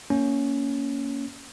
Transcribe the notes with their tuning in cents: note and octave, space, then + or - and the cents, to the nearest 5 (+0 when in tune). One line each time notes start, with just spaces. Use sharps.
A#3 +0 C#4 +10